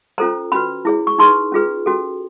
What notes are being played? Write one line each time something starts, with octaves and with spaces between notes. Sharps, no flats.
C#4 F4 A4 C5 A#5
C#4 F#4 B4 B5
E4 G#4 C#5
C#6
D#4 G#4 B4 C6
C#4 F4 G#4 B4
C#4 F#4 A4